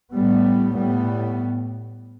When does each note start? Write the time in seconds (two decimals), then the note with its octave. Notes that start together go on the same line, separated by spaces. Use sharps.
0.13 A2 G3 B3
0.77 A2 G3 B3